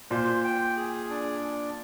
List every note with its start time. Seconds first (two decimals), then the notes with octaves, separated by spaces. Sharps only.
0.11 A#2 C5
0.44 G5
0.77 G#4
1.10 D4